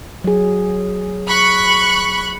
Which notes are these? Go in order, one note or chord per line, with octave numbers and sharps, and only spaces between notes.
F#3 G#4
B5 C#6 F#6